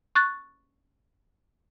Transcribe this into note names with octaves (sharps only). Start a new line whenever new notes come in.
C#6 F#6 A6